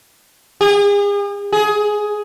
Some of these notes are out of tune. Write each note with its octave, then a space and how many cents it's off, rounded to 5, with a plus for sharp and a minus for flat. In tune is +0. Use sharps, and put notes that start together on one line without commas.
G#4 -40
G#4 +10